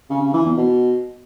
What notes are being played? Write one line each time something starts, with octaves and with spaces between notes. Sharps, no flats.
C#3
C#3
E3
E2
B2